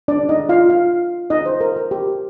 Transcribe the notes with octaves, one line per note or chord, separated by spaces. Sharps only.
D4 D5
D#4 D#5
F4 F5
F4 F5
D#4 D#5
C5
A#4
A#4
G4